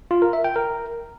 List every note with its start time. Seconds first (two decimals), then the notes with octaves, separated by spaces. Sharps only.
0.11 F4
0.22 A#4
0.33 E5
0.44 G5
0.56 A#4